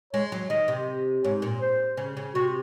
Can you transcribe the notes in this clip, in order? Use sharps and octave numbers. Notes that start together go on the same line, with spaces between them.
G#3 C#5
F#3
D#3 D#5
C3
G#2 C#5
A#2
C5
C#3
C#3
C3 F#4